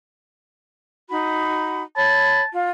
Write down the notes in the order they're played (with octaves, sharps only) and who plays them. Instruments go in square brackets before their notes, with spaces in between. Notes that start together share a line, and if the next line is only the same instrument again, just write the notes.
[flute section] D#4 F#4 B5
[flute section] C#5 B5 [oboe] A5
[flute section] F4